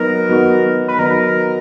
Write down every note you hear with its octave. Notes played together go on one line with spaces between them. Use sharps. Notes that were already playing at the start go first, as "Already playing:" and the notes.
Already playing: F#3 B3 D#4 F#4 A#4
F#3 B3 D#4 F#4
B4
F#3 B3 D#4 F#4 A#4